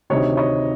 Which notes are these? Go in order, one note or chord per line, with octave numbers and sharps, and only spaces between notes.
D2 C3 D#3 C#5 D#5
C#5 D#5